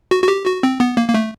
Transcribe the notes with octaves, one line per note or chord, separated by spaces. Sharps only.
F#4
F#4
G4
F#4
C4
B3
A#3
A#3
A3